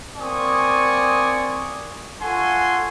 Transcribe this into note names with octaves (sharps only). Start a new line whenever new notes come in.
A#3 C4 D5 G#5 C#6 D#6
F4 A4 F#5 G#5 C6 C#6